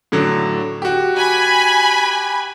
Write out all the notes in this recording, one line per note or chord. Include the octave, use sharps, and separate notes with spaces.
A2 D3 F#3
F#4 G4
G#5 B5